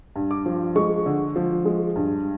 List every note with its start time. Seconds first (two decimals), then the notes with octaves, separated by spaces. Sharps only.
0.16 G2
0.31 D6
0.46 F3
0.76 G#3 C#6
1.06 D3
1.36 F3
1.65 G#3
1.96 G2